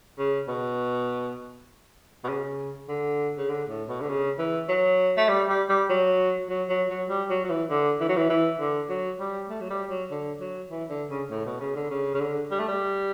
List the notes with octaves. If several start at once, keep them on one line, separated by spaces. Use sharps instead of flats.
C#3
B2
B2
C#3
D3
C#3
D3
A2
B2
D3
C#3
E3
F#3
A3
G3
G3
G3
F#3
F#3
F#3
F#3
G3
F#3
F#3
E3
D3
E3
F#3
E3
E3
D3
F#3
G3
A3
F#3
G3
F#3
D3
F#3
E3
D3
C#3
A2
B2
C#3
D3
C#3
C#3
D3
G3
A3
G3